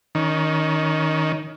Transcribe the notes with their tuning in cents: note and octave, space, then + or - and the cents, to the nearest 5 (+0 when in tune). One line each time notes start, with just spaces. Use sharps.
D#3 +10 C#4 +35